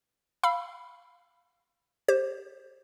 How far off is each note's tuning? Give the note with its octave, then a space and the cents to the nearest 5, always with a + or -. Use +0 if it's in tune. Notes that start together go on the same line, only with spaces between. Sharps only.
F5 +0 B5 +0 E6 +35
G4 +5 C5 +25